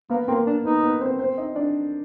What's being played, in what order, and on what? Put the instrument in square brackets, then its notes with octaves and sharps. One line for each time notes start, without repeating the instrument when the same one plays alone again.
[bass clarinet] A#3 [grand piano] B3 B4
[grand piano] A#3 A#4 [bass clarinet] C4
[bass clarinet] D4
[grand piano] B3 B4 [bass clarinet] D#4
[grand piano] B3 B4
C4 C5
C4 C5
D#4 D#5
D4 D5